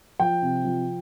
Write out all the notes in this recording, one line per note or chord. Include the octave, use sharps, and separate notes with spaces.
F3 G5
C3
F3